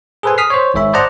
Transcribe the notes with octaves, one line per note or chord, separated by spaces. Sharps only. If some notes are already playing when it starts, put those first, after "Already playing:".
G#4 A4 B4 C5 G#5
D#6 F6 B6 C7
C5 C#5
G#1 G#2 C#5 E5 B5
C5 D5 D#5 F#5 A5 A#5